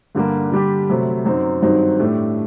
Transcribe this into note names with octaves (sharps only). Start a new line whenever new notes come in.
G2 D3 G3 A#3
D3 G3 D4 G4
C3 F#3 A3
F#2 F#3 C4 D#4
G2 D#3 F#3 C4 D#4
A2 A3 D4 G4